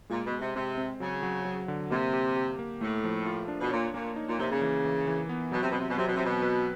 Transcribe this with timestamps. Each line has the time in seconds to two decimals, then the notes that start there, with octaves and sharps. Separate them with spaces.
0.10 A#2 G#3
0.25 B2
0.32 G#3
0.40 C3
0.55 C3 C4
0.78 C4
1.00 C#3 F#3
1.23 F#3
1.45 F#3
1.68 D3
1.90 C3 A#3
2.13 G4
2.36 G4
2.59 A#3
2.81 A2 A3
3.04 F3
3.26 F4
3.48 D4
3.60 B2
3.71 A#2 C#5
3.94 A#2 A#3
4.16 D#4
4.27 A#2
4.39 C3 A#3
4.50 C#3
4.61 E3
4.85 E3
5.07 E3
5.29 B3
5.52 B2 F#3
5.62 C3
5.70 B2
5.74 C4
5.79 C3
5.89 B2
5.98 C3 F#3
6.07 B2
6.16 C3
6.20 B2 C4
6.42 B4